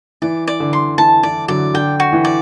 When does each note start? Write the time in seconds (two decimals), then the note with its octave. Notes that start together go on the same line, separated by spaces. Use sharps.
0.22 E3 D5
0.47 D5
0.60 D3
0.73 C6
0.98 E3 A5
1.23 E3 D5
1.48 D3 F#3 D5
1.74 D3 G5
2.00 F#4
2.13 E3
2.25 D5